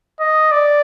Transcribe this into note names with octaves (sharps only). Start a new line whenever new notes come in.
D#5
D5